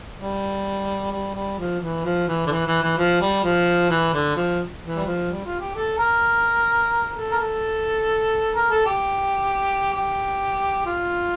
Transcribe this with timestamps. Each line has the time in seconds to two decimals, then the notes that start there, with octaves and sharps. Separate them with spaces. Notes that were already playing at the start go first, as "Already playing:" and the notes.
0.19 G3
1.12 G3
1.35 G3
1.59 F3
1.81 E3
2.05 F3
2.28 E3
2.46 D3
2.51 E3
2.67 E3
2.82 E3
2.98 F3
3.21 G3
3.44 F3
3.90 E3
4.13 D3
4.36 F3
4.84 E3
4.96 G3
5.06 F3
5.29 G3
5.45 F4
5.60 G4
5.75 A4
5.99 A#4
7.15 A4
7.32 A#4
7.39 A4
8.54 A#4
8.70 A4
8.86 G4
9.93 G4
10.86 F4